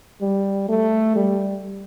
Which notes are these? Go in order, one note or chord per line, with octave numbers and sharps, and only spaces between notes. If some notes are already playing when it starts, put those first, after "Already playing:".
G3
A3
G3